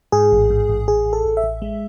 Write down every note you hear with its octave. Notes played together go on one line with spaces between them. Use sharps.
G#2 G#4
A1
G#2
A1
A1 G#4
A1
A4
A1
E5
A1
G#3